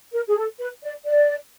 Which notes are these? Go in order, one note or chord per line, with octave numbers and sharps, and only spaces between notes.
A#4
G#4
A4
B4
D5
D5